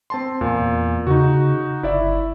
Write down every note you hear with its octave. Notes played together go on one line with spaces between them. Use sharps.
C4 A5 C6
E2 A#2
C#3 D#4 F#4
G1 E4 D5 E5